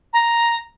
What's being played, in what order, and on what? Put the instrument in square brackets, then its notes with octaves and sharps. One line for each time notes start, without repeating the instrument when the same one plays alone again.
[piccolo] A#5